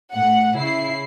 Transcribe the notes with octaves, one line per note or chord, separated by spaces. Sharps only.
A2 F#5
C#3 E4 C7